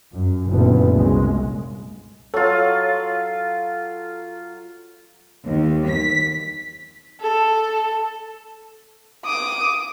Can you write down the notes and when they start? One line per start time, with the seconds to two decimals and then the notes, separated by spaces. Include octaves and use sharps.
0.12 F#2
0.47 F#1 A#2 D3 A3 B3
0.93 C2 C#3 G#3
2.34 F#3 F4 A4
5.44 D#2
5.89 B6
7.21 A4
9.25 D6 D#6